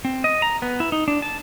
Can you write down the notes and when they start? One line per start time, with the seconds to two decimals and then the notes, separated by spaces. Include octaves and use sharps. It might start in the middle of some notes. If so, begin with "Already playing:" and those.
0.05 C4
0.24 D#5
0.42 A#5
0.62 B3
0.80 E4
0.92 D#4
1.08 D4
1.22 A5